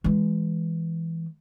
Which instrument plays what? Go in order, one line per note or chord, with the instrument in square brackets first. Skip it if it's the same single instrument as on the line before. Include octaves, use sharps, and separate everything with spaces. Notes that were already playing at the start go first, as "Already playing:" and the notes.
[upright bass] E3 G#3